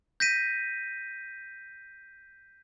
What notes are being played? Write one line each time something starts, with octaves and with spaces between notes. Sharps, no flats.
G6 A#6 B6 D#7